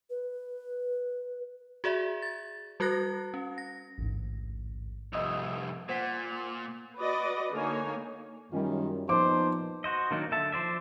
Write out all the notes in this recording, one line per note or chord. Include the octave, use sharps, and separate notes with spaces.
B4
F#4 G#4 D5 E5
A6
G3 F#4 A#4 F#6 A#6
C#4
A#6
A1 D2 G#2
C2 F2 D#5 D#6 E6
A#2 C5 F#5 B6
F#4 B4 D5 D#5
D3 A#3 D#4 C#5 G#5
F#2 D#3 G3 C#4 F4
A#2 F3 B3 D#4 C5 A5 D6
F#4 C5 D#5
D#3 F#3 A#3 D4 D#4
D3 E5 A5
F3 C5 D5 E5